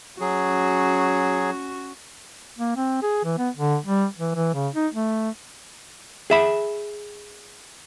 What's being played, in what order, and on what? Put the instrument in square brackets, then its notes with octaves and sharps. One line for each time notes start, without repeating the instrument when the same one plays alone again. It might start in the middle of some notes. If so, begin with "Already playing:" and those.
[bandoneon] F#3 G#4 [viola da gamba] C#4 F#4
[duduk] A#3
C4
G#4
E3
B3
D3
G3
E3
E3
C#3
D#4
A3
[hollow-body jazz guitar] G#4 E5 B5